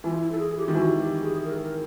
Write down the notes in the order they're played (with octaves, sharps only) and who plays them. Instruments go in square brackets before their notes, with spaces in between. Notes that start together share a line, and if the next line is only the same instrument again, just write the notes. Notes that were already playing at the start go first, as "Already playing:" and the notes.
[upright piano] E3 [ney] F4
[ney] E4
A4
G#4
G4
[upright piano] D#3 [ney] F4
[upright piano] E3 [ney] F#4
[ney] G4
G#4
A#4
A#4